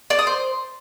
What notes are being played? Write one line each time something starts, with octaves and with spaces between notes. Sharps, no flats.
D5
D#6
C5